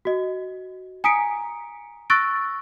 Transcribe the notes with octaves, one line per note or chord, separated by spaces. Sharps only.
F#4 D#5
G#5 A#5 D#6 B6 C#7 D7
C#6 E6 F#6 A6 A#6 D7